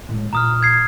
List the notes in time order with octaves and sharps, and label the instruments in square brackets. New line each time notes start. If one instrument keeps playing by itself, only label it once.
[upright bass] A2 G#3
[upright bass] A#2 [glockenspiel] A#5 D#6 F6
[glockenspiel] G#6 C7